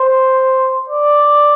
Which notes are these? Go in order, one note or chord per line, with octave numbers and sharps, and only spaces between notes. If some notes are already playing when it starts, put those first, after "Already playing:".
Already playing: C5
D5